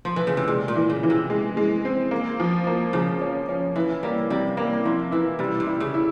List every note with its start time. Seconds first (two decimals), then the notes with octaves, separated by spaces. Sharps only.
0.05 F3
0.16 E3
0.27 C#3
0.37 C3
0.48 A#2 G#3
0.68 A#2
0.76 E3
0.90 C#3
1.03 E3
1.10 C3
1.30 G#3
1.57 G#3
1.85 C4
2.11 A#3
2.40 F3
2.67 A#3
2.93 C#3 F3
3.22 C#4
3.49 C#4
3.76 E3 E4
4.03 G3 A#3
4.30 C3 G3
4.57 G3 A#3
4.85 F3 E4
5.12 E3 E4
5.39 C3 G3
5.60 C3
5.67 E4
5.80 C#3
5.94 E4